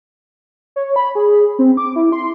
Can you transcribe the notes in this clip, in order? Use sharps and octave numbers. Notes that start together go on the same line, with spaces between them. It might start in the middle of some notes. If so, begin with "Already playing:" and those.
C#5
B5
G#4
C4
D6
E4
C6